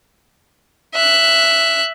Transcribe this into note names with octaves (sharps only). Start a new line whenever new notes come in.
E5 F#6